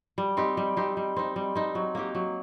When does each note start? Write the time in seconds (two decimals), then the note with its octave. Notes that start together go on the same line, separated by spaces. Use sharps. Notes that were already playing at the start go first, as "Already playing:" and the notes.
0.18 G3
0.37 C4 D#4 G4
0.57 G3
0.77 C4 D#4 G4
0.97 G3
1.17 C4 D#4
1.36 G3
1.55 C4 D#4
1.75 F#3
1.95 A#3 D#4 G4
2.15 F#3